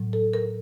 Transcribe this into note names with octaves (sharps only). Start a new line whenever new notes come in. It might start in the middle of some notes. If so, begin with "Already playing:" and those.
Already playing: A2 F#3
A4
A#4